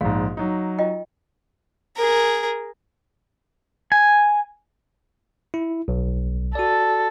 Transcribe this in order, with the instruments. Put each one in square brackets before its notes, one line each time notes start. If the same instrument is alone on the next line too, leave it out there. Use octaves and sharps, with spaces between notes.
[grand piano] A#1 G#2 [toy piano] F5
[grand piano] F#3 D#4
[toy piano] F4 D#5 G5
[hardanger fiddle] G#4 A#4
[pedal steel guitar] G#5
[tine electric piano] E4
B1
[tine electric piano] F#4 D5 [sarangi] A4